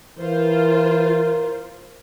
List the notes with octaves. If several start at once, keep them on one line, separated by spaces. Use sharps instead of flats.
E3 F4 A#4 C5